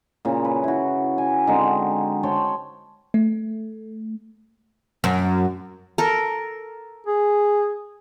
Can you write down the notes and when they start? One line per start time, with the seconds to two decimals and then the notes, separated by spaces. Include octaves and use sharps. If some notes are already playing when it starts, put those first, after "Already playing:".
0.25 A#2 C#3
0.45 B4
0.64 E4 F#4
1.18 G#5
1.47 D3 G#3 C4 D#4
2.23 C5 C#5 G5 A5
3.14 A3
5.04 F#2
5.98 A4 A#4
7.07 G#4